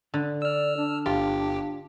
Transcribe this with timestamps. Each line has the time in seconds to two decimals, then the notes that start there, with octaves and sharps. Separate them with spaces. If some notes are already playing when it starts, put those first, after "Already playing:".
0.14 D3
0.42 D5 E6 F6
0.77 D4
1.06 G1 F4 G4